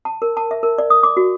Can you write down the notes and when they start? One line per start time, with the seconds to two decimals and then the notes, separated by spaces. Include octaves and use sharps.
0.05 A5
0.22 A#4
0.37 A5
0.51 E5
0.63 A#4
0.78 D5
0.90 D#6
1.03 D6
1.17 F#4